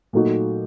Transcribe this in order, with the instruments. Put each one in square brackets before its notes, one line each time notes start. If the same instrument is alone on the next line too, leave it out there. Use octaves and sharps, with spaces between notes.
[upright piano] A#2 F#3 A3 D#4 F#4